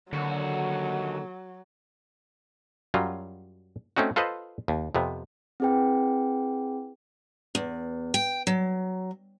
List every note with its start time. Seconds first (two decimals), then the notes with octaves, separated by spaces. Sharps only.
0.13 D#2 D3 F#3 F#4
2.94 F#2 F#3 G3 F4
3.97 A3 C4 C#4 D#4 F#4
4.16 F4 A4 B4 C5 D#5
4.68 D#2
4.95 F2 C3 B3
5.60 C4 E4 G#4 B4 G5
7.55 E2
8.14 G5
8.47 F#3